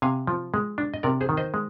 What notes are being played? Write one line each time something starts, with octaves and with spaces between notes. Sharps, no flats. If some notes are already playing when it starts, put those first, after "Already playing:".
C3 F5 G#5
F3
G#3
D4
D#5
C3 A#4 D5
G#4 C5
D#3
C5 D#5
G#3